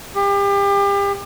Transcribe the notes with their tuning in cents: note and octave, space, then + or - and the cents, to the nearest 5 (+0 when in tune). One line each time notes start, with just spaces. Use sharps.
G4 +35